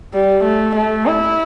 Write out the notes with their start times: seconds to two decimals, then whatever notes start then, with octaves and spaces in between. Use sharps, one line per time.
0.13 G3
0.44 A3
0.76 A3
1.07 E4